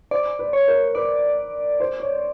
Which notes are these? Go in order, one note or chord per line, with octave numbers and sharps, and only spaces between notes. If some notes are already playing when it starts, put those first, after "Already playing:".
C5 D5
B4
C#5
A#4
B4 D5
C5
C#5